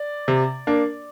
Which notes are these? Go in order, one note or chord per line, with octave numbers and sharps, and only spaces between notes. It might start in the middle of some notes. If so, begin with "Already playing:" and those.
Already playing: D5
C3
A#3 D4